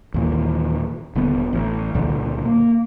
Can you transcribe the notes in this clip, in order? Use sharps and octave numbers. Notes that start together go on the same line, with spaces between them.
D#2 A#2 E3
D#1 D3 B3
A1
C#2 A#2 D3
A#3